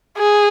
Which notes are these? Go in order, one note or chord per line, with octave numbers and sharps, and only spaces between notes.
G#4